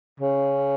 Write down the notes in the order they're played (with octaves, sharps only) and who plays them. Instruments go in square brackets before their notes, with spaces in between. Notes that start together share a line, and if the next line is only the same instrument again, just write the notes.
[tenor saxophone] C#3